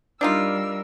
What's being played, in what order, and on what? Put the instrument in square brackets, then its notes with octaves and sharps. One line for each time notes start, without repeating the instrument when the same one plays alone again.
[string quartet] G3 A#4 E6 [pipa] D4 D#4 F4